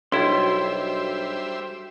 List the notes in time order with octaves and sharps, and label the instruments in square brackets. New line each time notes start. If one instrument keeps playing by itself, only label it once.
[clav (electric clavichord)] B1 E4 [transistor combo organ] G3 C5 E5 [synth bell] D4 F#4 [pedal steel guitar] C6